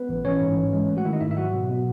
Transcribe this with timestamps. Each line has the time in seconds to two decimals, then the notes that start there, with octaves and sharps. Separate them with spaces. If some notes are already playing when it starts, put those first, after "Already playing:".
Already playing: B3 B4
0.09 A1
0.25 A1 C#4 C#5
0.41 G#2
0.56 E3
0.73 G#3
0.89 A3
0.97 F#4 F#5
1.05 D#3 E4 E5
1.13 D#4 D#5
1.21 G#2 E4 E5
1.31 E5
1.37 F#3 F#4 F#5
1.54 B2
1.69 B2